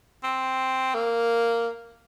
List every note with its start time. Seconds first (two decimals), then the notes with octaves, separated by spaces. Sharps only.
0.24 C4
0.94 A#3